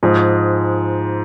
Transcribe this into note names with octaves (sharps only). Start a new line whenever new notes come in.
G#2 F3 G#3